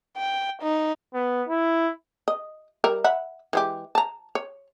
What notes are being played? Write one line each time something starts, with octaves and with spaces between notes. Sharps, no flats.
G5
D#4
B3
E4
D#5
G3 A#4 E5
E5 F#5 B5
E3 G#3 G4
A5 A#5
C#5